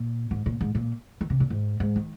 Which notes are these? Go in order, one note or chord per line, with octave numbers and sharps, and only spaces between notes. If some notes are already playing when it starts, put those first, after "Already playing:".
Already playing: A#2
G#2
A#2
G#2
A#2
D#3
C3
A#2
G#2
G#2
D#3